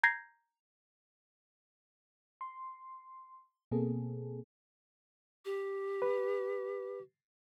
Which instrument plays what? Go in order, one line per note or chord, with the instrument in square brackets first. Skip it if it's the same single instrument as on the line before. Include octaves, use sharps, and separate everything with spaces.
[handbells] A#5 G6 G#6 A#6 C7
[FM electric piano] C6
B2 A#3 C4 G#4 A4
[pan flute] G4
[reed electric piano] B4